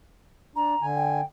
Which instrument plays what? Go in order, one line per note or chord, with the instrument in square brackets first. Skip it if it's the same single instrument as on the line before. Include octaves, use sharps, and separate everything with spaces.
[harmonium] D4 [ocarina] A#5
[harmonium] D3 G#5
[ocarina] G5